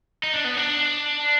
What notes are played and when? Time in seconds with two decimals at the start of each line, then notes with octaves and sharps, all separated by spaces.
0.23 D#4
0.33 D4
0.45 B3
0.57 D4